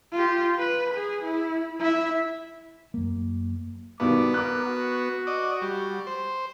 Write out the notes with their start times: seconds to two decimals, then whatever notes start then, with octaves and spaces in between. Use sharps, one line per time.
0.12 F4 G4
0.59 B4
0.94 G#4
1.24 E4
1.79 E4 E5
2.94 F#2 A#3
4.00 G2 B2 D#3 B3 D6
4.34 A#4 D6 F#6
4.65 F#4
5.27 D5 D#5
5.62 G3
6.07 C5